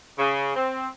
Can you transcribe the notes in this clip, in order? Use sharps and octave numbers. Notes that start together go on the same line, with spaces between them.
C#3
C4